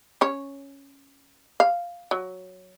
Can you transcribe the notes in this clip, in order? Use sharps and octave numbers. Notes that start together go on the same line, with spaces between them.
C#4 C#5
F5
F#3